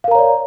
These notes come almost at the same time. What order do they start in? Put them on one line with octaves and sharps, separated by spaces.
F5 A#4 A#5 C#5 D5